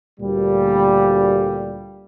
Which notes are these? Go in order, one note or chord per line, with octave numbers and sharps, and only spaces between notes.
D2 A#2 G3